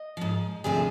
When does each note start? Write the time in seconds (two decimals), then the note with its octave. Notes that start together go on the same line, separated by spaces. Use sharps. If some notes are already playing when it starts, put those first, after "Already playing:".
Already playing: D#5
0.17 G#2 F3
0.64 D2 C3 F3 G#4